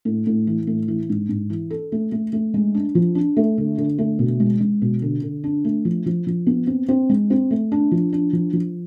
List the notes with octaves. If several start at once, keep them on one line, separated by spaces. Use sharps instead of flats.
A2
A2
E3
A2
E3
G#2
G#2
E3
A4
A3
A3
A3
G#3
D4
F3
D4
A3
D3
D3
A3
B2
G#3
G#3
B2
D3
D3
D4
A3
F3
F3
F3
B3
C4
C4
G#3
C4
A3
D4
F3
D4
F3
F3